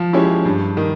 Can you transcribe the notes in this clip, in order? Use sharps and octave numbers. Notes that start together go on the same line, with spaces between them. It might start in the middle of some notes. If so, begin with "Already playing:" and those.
Already playing: F3
G#3 C#4 E4 G4
G2
D#3